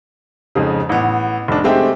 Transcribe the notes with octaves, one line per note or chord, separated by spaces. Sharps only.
F2 G#2 C#3
A1 B3
F1 D4
G#3 A3 C4 G4 E5 G5